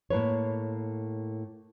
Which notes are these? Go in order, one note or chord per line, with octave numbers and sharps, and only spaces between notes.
A2 A#3 B4 C#5